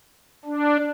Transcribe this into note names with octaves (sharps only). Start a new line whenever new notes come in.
D4